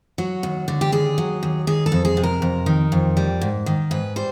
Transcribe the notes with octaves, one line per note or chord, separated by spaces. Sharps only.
F#3 F#4
D#2
D3
G4
D#2 G#4
F#3
D#2
D#3 G#4
A4
F2
G#4
C3
A#4
F2
D#3
F2
G3
G#2
D#3
G#2 B4
G3 C5